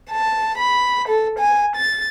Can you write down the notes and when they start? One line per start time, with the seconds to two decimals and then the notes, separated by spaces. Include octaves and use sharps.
0.11 A5
0.58 B5
1.08 A4
1.39 G#5
1.75 A6